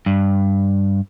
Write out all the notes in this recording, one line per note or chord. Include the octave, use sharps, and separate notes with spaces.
G2